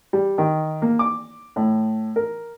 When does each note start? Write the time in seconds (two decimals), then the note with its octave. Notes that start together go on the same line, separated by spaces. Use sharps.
0.13 G3
0.38 D#3
0.82 A#3
0.99 D6
1.56 A2
2.16 A#4